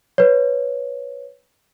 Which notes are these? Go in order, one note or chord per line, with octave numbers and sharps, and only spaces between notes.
B4 C#5